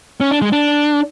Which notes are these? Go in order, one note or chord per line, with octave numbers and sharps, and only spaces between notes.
C#4
D4
G#3
D4